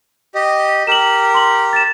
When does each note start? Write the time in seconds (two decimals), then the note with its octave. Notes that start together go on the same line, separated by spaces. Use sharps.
0.35 G4 D#5
0.87 G4 A#4 E7 F#7
1.34 C6 F#7
1.73 A6 E7